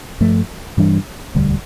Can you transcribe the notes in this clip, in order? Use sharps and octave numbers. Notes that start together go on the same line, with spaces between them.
G2 F3 A3
G2 E3 G3 D4
E1 D2 D3 G3